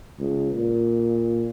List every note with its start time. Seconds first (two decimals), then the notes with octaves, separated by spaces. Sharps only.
0.20 C#2
0.54 A#2